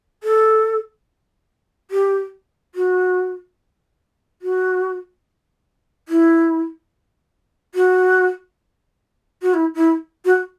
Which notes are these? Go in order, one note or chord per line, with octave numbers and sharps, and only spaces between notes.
A4
G4
F#4
F#4
E4
F#4
F#4
E4
E4
F#4